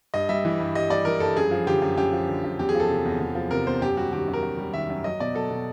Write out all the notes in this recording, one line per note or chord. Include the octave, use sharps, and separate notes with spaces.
G2 D#5
G3 E5
E3
G2
G2 D#5
G3 D5
E3 A#4
G2 A4
F#2 G#4
F3
D3 G4
F#2
F#2 G4
F3
D3
F#2
E2 G4
G#4
F3
A4
C3
E2
E2
F3
C3 A#4
E2 C5
F#2 G4
G3 F#4
D#3 G4
F#2
A#4
F#2
G3
D#3 E5
F#2
F#3 D#5
B2 D5
F#3 A4
B2